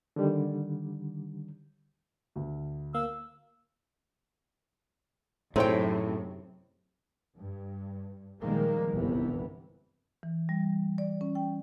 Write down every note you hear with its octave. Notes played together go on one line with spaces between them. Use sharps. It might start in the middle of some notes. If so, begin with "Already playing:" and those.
D3 D#3 G3
D2
A#3 F5 E6
F#2 A2 C3 C4 D#4 G#4 C#5 G5
G2
A#2 D#3 F3 G3 G#3 A#3
G1 C2 G2 C3 E3 B3
E3
G3
D5
C#4
G5